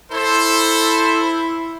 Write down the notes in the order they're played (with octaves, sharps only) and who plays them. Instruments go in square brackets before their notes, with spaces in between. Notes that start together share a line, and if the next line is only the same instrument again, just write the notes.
[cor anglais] E4 [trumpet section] A4 C5